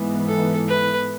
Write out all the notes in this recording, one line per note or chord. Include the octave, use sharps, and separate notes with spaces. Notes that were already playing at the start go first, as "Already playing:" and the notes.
Already playing: G#2 E3 B3
A4
B4